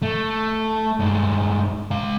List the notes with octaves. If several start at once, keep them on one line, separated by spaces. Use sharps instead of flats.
A3
G2 G#3
G#3 F5